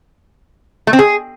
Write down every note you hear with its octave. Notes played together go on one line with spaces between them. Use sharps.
A3
C4
G#4